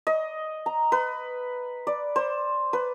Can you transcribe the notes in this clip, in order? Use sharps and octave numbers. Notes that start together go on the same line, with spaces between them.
D#5
A#5
B4
D5
C5
B4